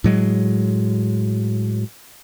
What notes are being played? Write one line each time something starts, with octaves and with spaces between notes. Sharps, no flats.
A2 F#3 G#3